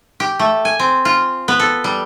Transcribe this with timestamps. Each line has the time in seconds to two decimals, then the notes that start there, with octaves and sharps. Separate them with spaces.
0.20 G4
0.39 A3
0.65 G#5
0.80 C4
1.05 F4
1.48 B3
1.59 A4
1.84 G3